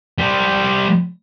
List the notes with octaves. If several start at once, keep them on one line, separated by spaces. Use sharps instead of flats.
G3 C5